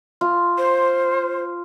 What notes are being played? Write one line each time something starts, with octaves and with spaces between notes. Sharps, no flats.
F4
C5